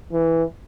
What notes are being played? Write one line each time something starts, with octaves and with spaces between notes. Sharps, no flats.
E3